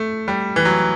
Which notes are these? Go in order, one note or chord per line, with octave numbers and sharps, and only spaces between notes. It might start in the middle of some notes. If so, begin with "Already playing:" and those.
Already playing: A3
G3
E3
F#3